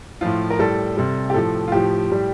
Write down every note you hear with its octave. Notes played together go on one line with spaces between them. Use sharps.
A2 F3 F4
A#4
A2 G3 A4
C3 G3
G4
A2 F3 A4
F4
A2 F3 G4
A2 G3